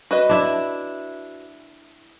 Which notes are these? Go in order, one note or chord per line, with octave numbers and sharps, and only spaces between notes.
F#4 B4 D#5
D4 E4